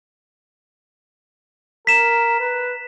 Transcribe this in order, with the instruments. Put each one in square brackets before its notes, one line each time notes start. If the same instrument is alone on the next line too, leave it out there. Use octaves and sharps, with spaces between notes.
[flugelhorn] A#4 [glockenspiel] B6 E7
[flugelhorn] B4